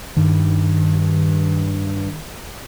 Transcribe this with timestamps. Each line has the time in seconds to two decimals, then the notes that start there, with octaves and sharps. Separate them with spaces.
0.17 G2 D#3